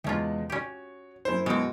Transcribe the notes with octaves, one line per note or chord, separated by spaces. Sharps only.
E2 C3 G#3 C#4 F4 A5
C#4 F#4 G4 C#5
F#2 E4 C5
B2 G#3 C4